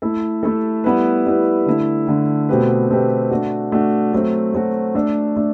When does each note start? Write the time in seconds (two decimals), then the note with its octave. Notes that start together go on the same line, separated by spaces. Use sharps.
0.02 A3 E4 A4
0.43 A3 E4 A4
0.84 G3 B3 E4 B4
1.26 G3 B3 E4 B4
1.66 D3 A3 E4
2.07 D3 A3 E4
2.49 B2 A3 C4 G4 B4
2.89 B2 A3 C4 G4 B4
3.31 A3 D4 F#4
3.72 A3 D4 F#4
4.13 F#3 A3 C4 F#4
4.53 F#3 A3 C4 F#4
4.95 A3 D4 A4
5.36 A3 D4